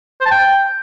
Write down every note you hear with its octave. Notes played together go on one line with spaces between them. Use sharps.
C5
A5
G5